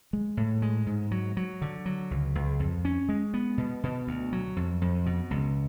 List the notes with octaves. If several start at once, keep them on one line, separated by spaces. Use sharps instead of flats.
G#3
A2
G#3
G#2
F#3
F#3
D3
F#3
C#2
C#2
F2
C#4
G#3
B3
B2
B2
D2
F#3
F2
F2
B2
C#2